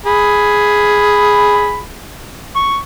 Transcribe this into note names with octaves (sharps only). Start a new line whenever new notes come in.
G#4 B5
C#6